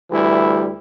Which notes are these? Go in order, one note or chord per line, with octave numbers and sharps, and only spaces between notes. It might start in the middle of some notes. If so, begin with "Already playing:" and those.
D2 E3 G3 E4